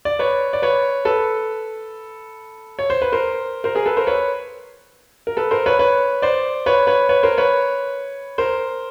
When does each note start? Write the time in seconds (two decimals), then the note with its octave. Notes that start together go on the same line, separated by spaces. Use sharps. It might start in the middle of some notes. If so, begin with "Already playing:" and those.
0.05 D5
0.19 B4 C#5
0.53 D5
0.62 B4 C#5
1.05 A4 B4
2.79 C#5
2.90 C5
3.02 B4
3.12 A#4 C5
3.64 A#4 C5
3.75 G#4 A#4
3.86 A4 B4
3.97 A#4 C5
4.07 B4 C#5
5.27 A#4
5.37 A4 B4
5.51 A#4 C5
5.66 B4 C#5
5.79 B4 C#5
6.22 C5 D5
6.66 B4 C#5
6.87 B4 C#5
7.09 B4 C#5
7.23 A#4 C5
7.38 B4 C#5
8.38 A#4 C5